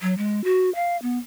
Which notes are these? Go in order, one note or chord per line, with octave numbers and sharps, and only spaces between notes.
F#3
G#3
F#4
F5
B3